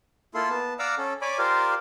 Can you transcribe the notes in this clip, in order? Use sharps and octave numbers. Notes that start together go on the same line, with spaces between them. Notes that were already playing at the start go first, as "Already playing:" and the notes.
A#3 E4 F4 A4 C6
B3 A5
D5 F5 F#5 A#5 D6 E6
C#4 A4
C#5 D5 G#5 B5 D6
F4 G4 A#4 C5 D5 F5